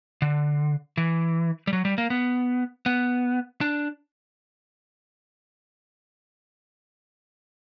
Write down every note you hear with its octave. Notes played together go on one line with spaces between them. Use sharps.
D3
E3
G3
F#3
G3
A#3
B3
B3
D4